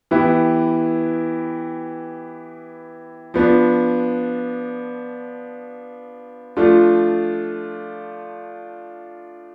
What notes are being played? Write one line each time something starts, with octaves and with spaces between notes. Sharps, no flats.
E3 B3 E4 G4
F3 B3 D4
F3 A3 D4 F4